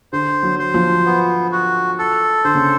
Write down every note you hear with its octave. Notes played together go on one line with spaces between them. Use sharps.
D3 C5
F#3
C5
F3
B3
F#4
A4
D3 C5
C#3